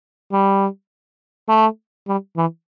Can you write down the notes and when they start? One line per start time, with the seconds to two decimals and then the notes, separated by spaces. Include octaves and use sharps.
0.32 G3
1.49 A3
2.07 G3
2.36 E3